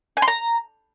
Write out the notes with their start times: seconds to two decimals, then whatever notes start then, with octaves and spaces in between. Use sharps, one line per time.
0.17 G#5
0.22 C6
0.28 A#5